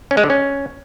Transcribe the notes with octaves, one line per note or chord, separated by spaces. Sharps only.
C#4
G#3
D3
C#4